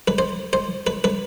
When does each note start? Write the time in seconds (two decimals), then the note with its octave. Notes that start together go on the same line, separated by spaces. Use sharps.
0.08 B4
0.18 C5
0.53 C5
0.87 B4
1.04 B4